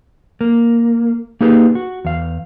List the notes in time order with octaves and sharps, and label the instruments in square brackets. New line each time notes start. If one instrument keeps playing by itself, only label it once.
[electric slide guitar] A#3
A#3 D#4 G4 G#4 B4
F#4
E2 F5